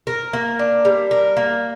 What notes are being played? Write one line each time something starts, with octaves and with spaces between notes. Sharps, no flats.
A#4
A#3
D4
G3
A#4
A#3